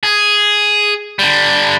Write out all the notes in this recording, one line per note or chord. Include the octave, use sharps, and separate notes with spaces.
G#4
D3 G3